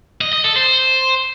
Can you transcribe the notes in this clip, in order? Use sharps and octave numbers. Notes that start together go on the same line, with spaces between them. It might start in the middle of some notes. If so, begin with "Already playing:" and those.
D#5
D#5
A4
C5